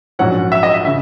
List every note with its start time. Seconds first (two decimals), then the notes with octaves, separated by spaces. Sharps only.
0.19 A#1 G#2 F#3 C#4 F#5
0.52 E5
0.63 D#5
0.74 E5
0.85 C#3 E5